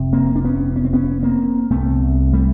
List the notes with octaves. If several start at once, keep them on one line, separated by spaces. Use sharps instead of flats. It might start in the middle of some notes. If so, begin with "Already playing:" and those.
Already playing: F1 C3
A#3 C4
D4
B3 C#4
C#4
C4
B3 C#4
A#3 C4
C2 C3 A3 B3
G3 A3